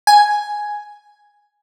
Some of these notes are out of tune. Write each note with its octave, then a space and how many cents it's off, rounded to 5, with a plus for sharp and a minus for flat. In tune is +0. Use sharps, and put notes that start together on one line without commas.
G#5 +5